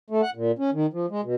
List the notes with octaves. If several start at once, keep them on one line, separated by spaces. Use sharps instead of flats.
A3
F#5
A#2
C#4
D#3
F3
G#3
B2